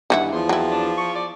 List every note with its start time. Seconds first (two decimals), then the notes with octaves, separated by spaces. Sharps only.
0.10 G2 D#3 E3 E4 F#5
0.33 E2 F3 C6
0.49 F#3 C4 E4
0.71 D4
0.98 C#6
1.15 D5